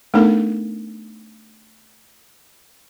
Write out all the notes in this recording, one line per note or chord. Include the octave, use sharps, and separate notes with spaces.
A3 B3 D4 D#4 A4 A#4